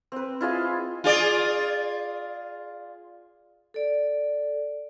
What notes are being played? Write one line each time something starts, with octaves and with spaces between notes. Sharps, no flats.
C4 B4
E4 F4 G#4 D#5
F4 G#4 D5
A4 D5